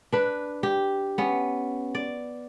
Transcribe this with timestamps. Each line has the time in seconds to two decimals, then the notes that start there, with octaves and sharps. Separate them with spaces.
0.13 D4 B4
0.63 G4
1.18 B3 C#4
1.95 D5